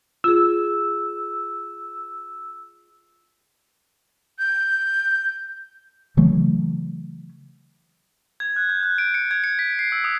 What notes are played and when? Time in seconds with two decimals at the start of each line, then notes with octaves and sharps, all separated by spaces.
0.24 F4 G#4 E6
4.39 G6
6.17 C#3 E3 F#3 A3
8.40 G#6
8.56 F#6
8.69 G6
8.83 F#6
8.98 D7
9.14 C#7
9.31 G#6
9.44 C#7
9.59 B6
9.79 C7
9.92 E6
10.04 D#6